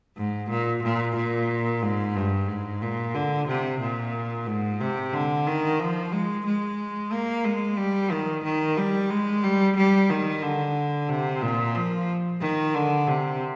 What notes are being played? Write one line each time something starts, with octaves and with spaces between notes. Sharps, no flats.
G#2
A#2
A#2
A#2
G#2
G2
G#2
A#2
D3
C3
A#2
G#2
C3
D3
D#3
F3
G#3
G#3
A#3
G#3
G3
D#3
D#3
G3
G#3
G3
G3
D#3
D3
C3
A#2
F3
D#3
D3
C3